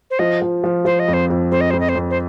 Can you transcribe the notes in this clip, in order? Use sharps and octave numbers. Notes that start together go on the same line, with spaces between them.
C5
F3 D#5
F3
F3
F3 C5
D#5
F2
C5
F2
F2 C5
D#5
F2 C5
D#5
C5
F2
C5